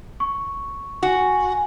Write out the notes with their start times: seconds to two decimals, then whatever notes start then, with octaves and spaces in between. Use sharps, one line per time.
0.20 C#6
1.03 F#4 G#5